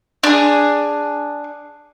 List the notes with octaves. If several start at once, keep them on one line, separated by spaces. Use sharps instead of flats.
D4 G#4